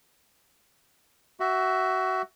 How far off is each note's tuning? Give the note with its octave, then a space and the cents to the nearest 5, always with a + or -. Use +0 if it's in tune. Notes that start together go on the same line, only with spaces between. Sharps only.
F#4 +20 E5 +0